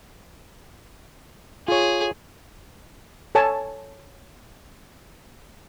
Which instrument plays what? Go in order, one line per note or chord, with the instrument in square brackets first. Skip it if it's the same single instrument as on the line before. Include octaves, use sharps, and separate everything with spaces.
[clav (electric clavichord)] F4 C#5 [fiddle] G#4
[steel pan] A4 C#5 G#5 A5